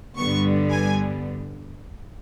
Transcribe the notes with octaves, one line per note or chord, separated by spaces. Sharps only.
G2 D3 G3 B3 C#6
G#5